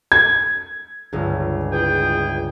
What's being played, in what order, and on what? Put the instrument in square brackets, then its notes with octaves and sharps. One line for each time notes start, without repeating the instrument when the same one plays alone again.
[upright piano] G#6
[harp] G1 C#2
[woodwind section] E2 G#4 G5